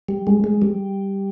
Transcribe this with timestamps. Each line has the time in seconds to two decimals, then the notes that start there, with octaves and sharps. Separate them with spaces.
0.09 G3
0.27 G#3
0.44 G#3
0.62 G3